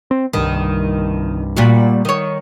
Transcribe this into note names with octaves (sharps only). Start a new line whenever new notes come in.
C4
C2 G2 D#3
A#2 G3 F#4
D#3 C#5